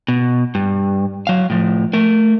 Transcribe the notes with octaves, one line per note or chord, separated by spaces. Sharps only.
B2
G2
F#3 F5
A2 F3
A3 A#4